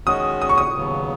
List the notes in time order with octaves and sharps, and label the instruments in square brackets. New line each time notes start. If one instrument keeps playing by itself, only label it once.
[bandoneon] D#3 G#3 C#4 F#4 [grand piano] D#6
[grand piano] D#6
C#6
D#6
[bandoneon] D#2 C#3 F#3 B3